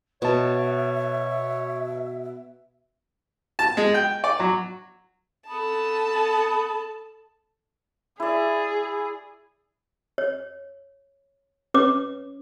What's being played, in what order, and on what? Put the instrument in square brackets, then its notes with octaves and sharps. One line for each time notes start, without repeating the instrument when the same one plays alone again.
[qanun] B2 [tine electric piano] B4 A5 [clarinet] C#5 [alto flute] E5
[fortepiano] A5
G#3
G5
D5
F#3
[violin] A4 A5 [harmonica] B5 D#6
[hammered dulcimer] E4 D5 [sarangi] G#4
[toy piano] C#5
C#4 B4 C#5 D6